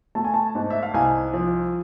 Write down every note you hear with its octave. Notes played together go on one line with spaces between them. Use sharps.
A3 A5
G#5
A5
G#2
E5
F5
C2 G#5
F3